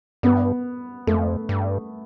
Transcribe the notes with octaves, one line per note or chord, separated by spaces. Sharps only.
G2 B3
F2 A3
G2